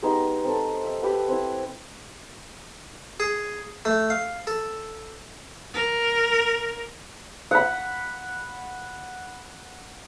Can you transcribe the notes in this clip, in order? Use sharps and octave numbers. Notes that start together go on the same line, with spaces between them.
G#3 B3 D#4 G4
C4 A4
E5
G4 B4 F#5
C4 E4
G#4
A3
F5
A4
A#4
F#5 B5